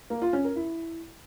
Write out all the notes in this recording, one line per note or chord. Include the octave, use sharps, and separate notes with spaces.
A#3
F4
C#4
A#4
E4